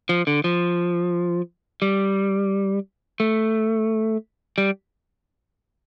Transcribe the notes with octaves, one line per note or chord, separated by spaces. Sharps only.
F3
D3
F3
G3
A3
G3